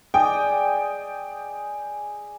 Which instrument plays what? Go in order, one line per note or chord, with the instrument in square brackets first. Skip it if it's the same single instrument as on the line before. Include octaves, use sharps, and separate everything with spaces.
[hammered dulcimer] G#4 D5 D#5 [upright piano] G5